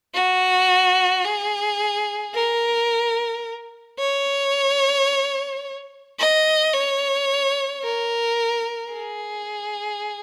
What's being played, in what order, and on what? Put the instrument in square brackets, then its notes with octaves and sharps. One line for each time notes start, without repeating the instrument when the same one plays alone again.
[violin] F#4
G#4
A#4
C#5
D#5
C#5
A#4
G#4